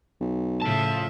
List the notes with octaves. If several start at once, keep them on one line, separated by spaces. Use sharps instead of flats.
B1
A2 C#3 F3 E5 A5